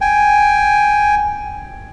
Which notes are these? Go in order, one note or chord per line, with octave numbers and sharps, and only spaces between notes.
G5 G#5